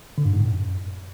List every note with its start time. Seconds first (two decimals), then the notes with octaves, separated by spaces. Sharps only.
0.18 D3
0.25 G2
0.33 G#2
0.40 A2
0.48 F#2